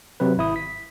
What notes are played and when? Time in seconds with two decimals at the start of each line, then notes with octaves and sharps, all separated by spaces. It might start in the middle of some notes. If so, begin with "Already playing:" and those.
0.20 C3 F#3 C4 B4
0.37 G#1 E4 D#6
0.56 B6